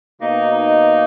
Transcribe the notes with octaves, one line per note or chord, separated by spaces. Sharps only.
B2 A#3 D#4